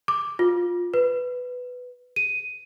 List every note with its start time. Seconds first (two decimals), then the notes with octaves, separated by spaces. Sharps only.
0.08 D6
0.39 F4
0.94 B4
2.16 D#7